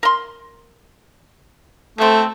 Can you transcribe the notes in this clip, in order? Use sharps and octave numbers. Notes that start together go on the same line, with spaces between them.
A#4 C6
B2 A3 C4